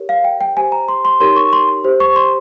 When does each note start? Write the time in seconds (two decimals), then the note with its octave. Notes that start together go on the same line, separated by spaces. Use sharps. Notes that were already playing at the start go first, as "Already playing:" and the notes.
Already playing: G4 A#4 C#5
0.09 F5
0.24 G5
0.41 G5
0.57 G4 C5 G#5
0.72 A#5
0.88 C6
1.05 C6
1.20 D#4 G4 A#4 C#5 C6
1.37 C#6
1.53 C6
1.84 G4 C5
2.00 C#6
2.16 C6